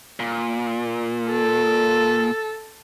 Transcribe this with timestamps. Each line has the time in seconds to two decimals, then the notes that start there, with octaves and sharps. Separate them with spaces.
0.20 A#2
1.30 A4